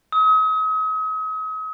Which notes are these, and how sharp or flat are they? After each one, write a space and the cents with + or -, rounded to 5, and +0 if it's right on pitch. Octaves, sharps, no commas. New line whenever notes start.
D#6 +40